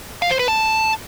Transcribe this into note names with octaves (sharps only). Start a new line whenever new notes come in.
F5
C5
B4
A5